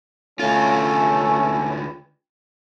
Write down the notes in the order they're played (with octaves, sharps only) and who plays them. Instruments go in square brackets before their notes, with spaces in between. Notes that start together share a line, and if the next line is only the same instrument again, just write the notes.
[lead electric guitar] D2 F4 [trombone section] A3 C#4